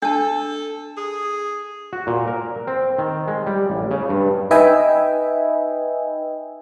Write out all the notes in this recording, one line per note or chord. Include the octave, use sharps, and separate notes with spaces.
D4 A4 A5
G#4
F#4
A#2
A#4
C4
D#3
G#3
G3
A1
C#3
G2
D#4 B4 D#5 E5 G5 G#5